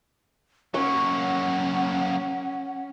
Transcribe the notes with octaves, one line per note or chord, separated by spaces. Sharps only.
F#3 A#3 C#4 F#5 C#6